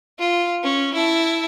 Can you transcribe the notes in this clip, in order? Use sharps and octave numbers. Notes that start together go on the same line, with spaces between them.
F4
C#4
E4 A5